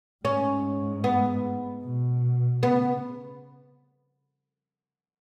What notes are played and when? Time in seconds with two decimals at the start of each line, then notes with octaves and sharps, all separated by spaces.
0.25 G#2 C#4
1.04 B3
1.84 B2
2.63 C#3 B3